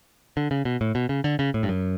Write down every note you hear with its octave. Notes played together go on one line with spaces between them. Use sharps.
D3
C#3
B2
A2
B2
C#3
D3
C#3
A2
G2
F#2